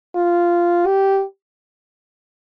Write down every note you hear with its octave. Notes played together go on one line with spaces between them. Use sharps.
F4
G4